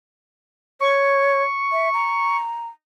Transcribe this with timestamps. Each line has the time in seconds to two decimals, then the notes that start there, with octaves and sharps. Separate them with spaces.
0.80 C#5 C#6
1.72 E5
1.93 A#5